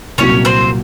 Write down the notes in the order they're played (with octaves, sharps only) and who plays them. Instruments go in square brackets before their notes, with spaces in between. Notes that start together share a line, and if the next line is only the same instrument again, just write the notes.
[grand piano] C2 A#2 F#3 [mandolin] C#4 C#5
[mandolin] C4 C5